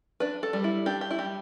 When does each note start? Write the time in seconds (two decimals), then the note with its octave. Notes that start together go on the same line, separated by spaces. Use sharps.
0.20 D4 B4
0.43 A4
0.53 G3
0.64 E4
0.86 D4 G4
1.01 G4
1.11 E4
1.19 G3 G4